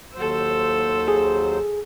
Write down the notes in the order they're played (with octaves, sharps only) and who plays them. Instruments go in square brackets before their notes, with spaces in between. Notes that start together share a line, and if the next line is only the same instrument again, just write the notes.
[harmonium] D#2 F#3 C5 [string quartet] A4 E6
[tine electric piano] G#4